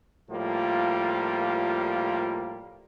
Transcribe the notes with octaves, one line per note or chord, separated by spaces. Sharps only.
A2 F3 G3 A#3 F4